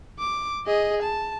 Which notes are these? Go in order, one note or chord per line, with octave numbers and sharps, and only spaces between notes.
D6
G#4 D#5
A5